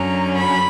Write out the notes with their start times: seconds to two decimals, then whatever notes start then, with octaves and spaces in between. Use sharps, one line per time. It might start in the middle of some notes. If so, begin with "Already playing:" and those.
Already playing: F#2 D3 F#3 C#4 A#5
0.36 B5